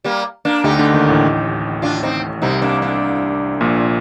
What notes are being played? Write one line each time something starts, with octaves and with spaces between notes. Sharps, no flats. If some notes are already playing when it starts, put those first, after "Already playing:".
G3 A#3
A#3 D4
D2 D3 D#4 G4
D2 D3
D#2 D#3
A1 A2
D4 F4
C4 D#4
C2 C3 C4 D#4
A#3 D4
A#3 D4
A#1 A#2